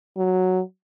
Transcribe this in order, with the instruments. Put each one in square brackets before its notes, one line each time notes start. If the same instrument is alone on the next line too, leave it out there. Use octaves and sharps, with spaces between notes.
[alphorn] F#3